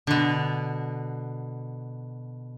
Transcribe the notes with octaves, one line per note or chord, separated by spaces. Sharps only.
B2 D3